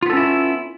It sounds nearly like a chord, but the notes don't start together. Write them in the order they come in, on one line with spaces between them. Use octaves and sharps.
F4 B3 A4 C#4 E4